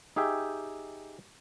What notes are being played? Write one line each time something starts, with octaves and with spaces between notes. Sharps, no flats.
D#4 G4 G#4 E5 G5